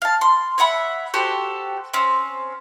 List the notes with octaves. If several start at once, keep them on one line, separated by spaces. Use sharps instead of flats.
F5 A5
C6
C#5 E5 F#5 B5
F#4 G4 A4 C5
C4 C#4